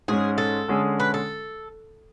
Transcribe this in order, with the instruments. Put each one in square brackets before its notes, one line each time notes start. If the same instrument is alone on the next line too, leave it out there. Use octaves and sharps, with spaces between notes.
[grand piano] G#2 G#3 C#4 [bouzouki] G#4
[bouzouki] A4
[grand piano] D3 G#3 C#4 G#4
[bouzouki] B4
A4